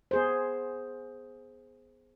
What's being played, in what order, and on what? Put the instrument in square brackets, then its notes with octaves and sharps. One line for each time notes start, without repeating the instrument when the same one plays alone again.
[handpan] B3 G#4 C5